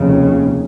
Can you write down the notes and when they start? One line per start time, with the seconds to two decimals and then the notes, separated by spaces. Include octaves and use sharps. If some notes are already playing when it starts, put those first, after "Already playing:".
Already playing: F1 D#2 C#3